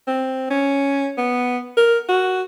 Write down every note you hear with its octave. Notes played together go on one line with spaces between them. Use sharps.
C4
C#4
B3
A#4
F#4